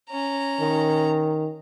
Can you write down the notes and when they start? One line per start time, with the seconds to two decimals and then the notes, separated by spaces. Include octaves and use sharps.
0.10 C#4 A#5
0.61 D#3